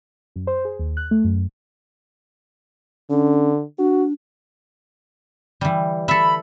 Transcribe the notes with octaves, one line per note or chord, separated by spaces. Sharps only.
F#2
C5
G#4
D#2
F#6
A3
F#2
D3 C#4
D4 F#4
E3 G3
A4 E5 B5